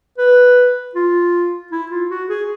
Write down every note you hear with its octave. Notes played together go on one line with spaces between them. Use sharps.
B4
F4
E4
F4
F#4
G#4